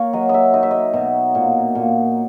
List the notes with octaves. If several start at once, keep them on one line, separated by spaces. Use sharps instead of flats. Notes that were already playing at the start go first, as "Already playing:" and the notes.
Already playing: A#3 A#4 C#5
F#3 D#5
D#5 E5
D#4 D#5
E5
D#5
B2
A#2
A#2